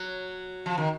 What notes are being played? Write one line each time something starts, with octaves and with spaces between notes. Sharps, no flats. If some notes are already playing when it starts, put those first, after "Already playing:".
Already playing: F#3
F3
D#3